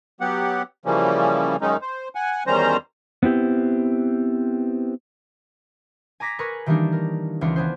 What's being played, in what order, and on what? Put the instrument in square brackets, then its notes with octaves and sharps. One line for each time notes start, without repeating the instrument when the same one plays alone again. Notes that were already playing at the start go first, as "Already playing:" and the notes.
[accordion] F#3 B3 G4 F#5
C#3 E3 F3 G3 A#3 C#4
F#2 D#3 G#3 C#4 D#4
C5
F#5 G#5
E2 D#3 G3 C#4 C5 A#5
[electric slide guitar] B3 C4 E4 G4
[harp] G#5 A#5 D6 A#6 B6
G#4 A#4 B4 C#6
D#3 E3 G3 A#3 D4 D#4
A#4
C#2 E3 D4 F4 C#7
B3 D4 G#4 C5